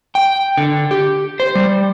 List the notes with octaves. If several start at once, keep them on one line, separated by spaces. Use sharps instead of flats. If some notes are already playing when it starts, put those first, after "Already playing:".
G5
D3
G4
C5
G3